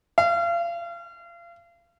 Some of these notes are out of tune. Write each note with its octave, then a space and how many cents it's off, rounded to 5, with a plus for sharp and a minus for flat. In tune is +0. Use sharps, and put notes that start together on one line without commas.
F5 -35